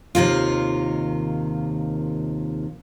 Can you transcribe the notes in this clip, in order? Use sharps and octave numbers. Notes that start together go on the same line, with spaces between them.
D#2 C3 D#3 F4